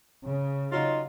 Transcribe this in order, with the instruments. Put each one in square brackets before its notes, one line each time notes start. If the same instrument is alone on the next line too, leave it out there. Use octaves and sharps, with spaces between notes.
[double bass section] C#3
[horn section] F#3 D#4 F4